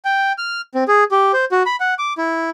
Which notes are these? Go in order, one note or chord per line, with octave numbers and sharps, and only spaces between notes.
G5
F6
C4
G#4
G4
C5
F#4
B5
F#5
D6
E4